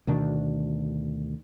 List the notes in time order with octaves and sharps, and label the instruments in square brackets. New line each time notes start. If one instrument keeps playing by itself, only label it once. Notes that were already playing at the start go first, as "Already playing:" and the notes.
[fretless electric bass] D2 B2 D#3 D4